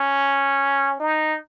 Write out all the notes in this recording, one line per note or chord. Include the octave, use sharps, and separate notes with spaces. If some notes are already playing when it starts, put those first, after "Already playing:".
Already playing: C#4
D#4